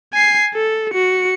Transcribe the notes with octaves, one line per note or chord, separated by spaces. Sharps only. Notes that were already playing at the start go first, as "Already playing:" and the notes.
G#5 C7
A4
F#4 C#7